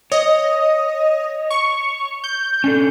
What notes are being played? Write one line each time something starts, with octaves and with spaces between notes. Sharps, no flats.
C#5 D#5
C#6
G6
C#4 D4 A4